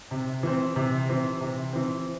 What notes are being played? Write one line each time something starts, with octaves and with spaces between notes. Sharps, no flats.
C3
E3 C4
C3
E3 C4
C3
E3 C4